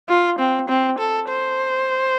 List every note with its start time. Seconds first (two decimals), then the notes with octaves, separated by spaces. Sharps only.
0.09 F4
0.39 C4
0.68 C4
0.98 A4
1.28 C5